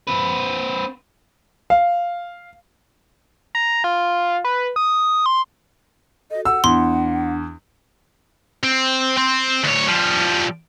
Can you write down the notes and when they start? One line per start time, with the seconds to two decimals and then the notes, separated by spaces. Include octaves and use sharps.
0.07 C4 B4
1.70 F5
3.55 A#5
3.84 F4
4.44 B4
4.76 D#6
5.26 C6
6.31 F#4 A4 D#5
6.45 F#5 E6
6.64 E2 D4 C6
8.64 C4
9.17 C4
9.64 D2 C#5
9.88 F3 G3